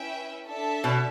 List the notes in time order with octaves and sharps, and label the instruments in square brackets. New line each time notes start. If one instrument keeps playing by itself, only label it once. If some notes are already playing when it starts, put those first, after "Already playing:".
Already playing: [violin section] C#4 E4 B4 E5 G5
D4 A4 E5 A5
[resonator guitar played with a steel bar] B2